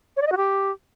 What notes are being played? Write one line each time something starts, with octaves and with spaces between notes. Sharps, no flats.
C#5
D5
D#5
F#4
G4